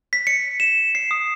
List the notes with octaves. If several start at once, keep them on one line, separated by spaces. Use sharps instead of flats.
B6
C#7
E7
C7
D#6